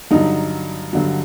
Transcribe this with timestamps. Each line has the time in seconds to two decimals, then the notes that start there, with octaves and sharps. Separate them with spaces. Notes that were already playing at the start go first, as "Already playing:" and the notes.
0.11 G2 D3 F#3 D#4
0.93 G2 D3 F#3